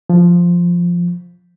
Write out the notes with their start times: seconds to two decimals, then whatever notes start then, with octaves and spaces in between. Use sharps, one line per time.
0.10 F3